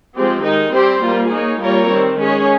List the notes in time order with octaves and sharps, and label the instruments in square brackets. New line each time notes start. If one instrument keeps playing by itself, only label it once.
[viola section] F3 G#3 C4 G4
D#3 G#3 D#4
G3 C4 G4 C5
G3 A#3 F4
A#3 D#4 G#4 C#5
G3 A#3 F4 A#4 C#5
D#3 G3 C4
G#3 C#4 G#4 C#5